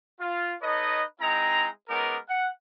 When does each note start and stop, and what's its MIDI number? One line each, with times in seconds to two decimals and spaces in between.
0.20 0.53 65
0.62 1.03 63
0.62 1.03 69
0.62 1.03 71
0.62 1.03 73
0.62 1.03 75
1.21 1.68 56
1.21 1.68 60
1.21 1.68 63
1.21 1.68 64
1.21 1.68 82
1.89 2.16 56
1.89 2.16 59
1.89 2.16 61
1.89 2.16 63
1.89 2.16 70
1.89 2.16 86
2.29 2.47 78